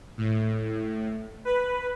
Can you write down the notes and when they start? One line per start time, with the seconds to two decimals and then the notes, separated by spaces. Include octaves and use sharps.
0.18 A2
1.45 B4